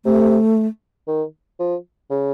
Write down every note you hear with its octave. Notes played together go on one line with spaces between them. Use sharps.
C3 A3
D#3
F3
C#3